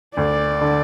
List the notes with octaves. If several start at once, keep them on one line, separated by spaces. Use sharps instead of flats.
D2 D5
D3